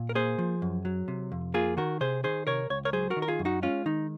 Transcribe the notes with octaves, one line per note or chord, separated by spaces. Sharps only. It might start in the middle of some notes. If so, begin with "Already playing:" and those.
Already playing: A#2
A#4
A#3 G#4 C5
F3
F#2
F#3
C3
F2
A#3 F4 G#4
D#3 F#4 A#4
C3 G#4 C5
D#3 G#4 C5
C3 A#4 C#5
C#2 C#5
A#4 C#5
F#3 G#4 C5
F#4 A#4
D#3
A#4
F4 G#4
F#2
D#4 F#4
G#3 C#4 F4
D#3 D#4